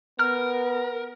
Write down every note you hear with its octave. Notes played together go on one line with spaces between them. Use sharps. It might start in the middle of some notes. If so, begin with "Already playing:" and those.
B3 A#4 F6